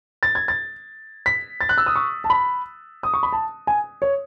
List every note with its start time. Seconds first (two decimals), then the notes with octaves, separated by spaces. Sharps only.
0.23 A6
0.35 G#6
0.48 A6
1.26 B6
1.61 A6
1.69 F#6
1.78 E6
1.86 D#6
1.96 C#6
2.24 A5
2.30 B5
3.03 D#6
3.14 C#6
3.23 B5
3.33 A5
3.67 G#5
4.02 C#5